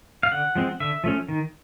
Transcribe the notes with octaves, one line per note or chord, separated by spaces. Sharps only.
F5
D3 F#5
F3 G#3 C4
D3 E5
F3 A3 C#4
D#3